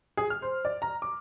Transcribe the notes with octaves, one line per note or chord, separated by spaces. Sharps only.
G#4
F6
C5
D5
A#5
D6